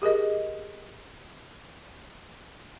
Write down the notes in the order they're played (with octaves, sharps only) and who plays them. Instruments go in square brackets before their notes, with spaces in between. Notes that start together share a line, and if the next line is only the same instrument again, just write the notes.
[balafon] G4 G#4 A#4 D#5